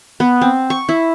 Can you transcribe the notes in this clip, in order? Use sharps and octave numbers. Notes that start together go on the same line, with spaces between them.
B3
C4
C#6
E4